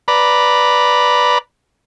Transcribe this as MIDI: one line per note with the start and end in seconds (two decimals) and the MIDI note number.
0.08 1.38 71
0.08 1.38 74
0.08 1.38 82
0.08 1.38 83